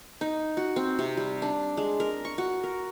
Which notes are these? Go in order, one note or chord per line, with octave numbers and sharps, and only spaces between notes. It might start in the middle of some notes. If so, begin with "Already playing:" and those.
D#4
F#4
C4
C3
G3
D4
G#3
A#4
C#6
F#4
A#4